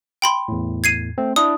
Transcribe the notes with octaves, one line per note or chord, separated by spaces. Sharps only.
G5 B5 C6
E2 A2
G#6 C7 D#7
A3 C4
D4 E4 D#6